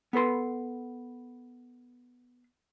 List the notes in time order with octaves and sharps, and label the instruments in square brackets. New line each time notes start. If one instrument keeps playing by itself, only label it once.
[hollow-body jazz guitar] B3 A4 B4 C6